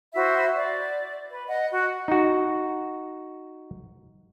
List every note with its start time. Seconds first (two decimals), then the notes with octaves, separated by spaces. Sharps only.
0.14 E4 F#4 C5 E5
0.55 D5
1.30 B4
1.47 D#5 F#5
1.72 F#4
2.08 D#4 F#4